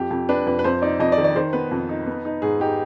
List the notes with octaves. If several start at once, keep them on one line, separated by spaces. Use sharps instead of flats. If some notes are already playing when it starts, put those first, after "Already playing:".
Already playing: F2 G4
F2
D4 B4
F2 B4
B4
F2 C5
D#4 D5
F2 D#5
D5
D#3
D5
D#3 C5
B3 B4
F2
D#4
B3
D#4
G#2 G#4
D#4 G4